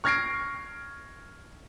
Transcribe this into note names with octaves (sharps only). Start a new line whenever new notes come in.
C#6 F6 G#6 A#6 C7 D7